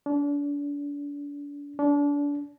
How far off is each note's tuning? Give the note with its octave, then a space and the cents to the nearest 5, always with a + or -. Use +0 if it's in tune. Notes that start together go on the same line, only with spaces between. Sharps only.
D4 -35
D4 -30